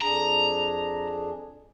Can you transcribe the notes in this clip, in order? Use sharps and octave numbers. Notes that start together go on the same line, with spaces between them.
F2 D4 G#4 A#5